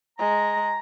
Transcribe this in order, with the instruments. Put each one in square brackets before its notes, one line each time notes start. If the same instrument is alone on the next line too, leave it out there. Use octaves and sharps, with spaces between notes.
[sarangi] G#3 [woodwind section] A#5